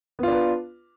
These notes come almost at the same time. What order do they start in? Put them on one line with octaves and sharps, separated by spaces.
B3 F4 D4 B4